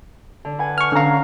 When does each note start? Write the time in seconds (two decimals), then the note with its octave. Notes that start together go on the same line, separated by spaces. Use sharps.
0.45 D3
0.59 B4 F#5 G#5
0.78 C#6 F6
0.92 D3 C#4 F5 A#5